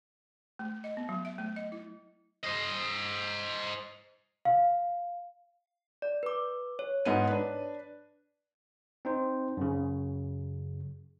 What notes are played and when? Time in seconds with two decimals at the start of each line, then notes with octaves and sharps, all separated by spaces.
0.59 A3
0.84 D#5
0.97 B3
1.09 F#3
1.25 E5
1.38 A3
1.56 D#5
1.72 E4
2.43 C5 D#5
4.45 F5
6.02 D5
6.23 B4 D6
6.79 C#5
7.05 G#2 B3 D#7
7.27 D4 B4
9.05 C4 D#4 C5
9.57 F#2 C#3